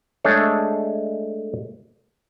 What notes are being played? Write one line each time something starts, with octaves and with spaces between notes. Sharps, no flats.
G#3 A3 D4 G#4 A4 C#5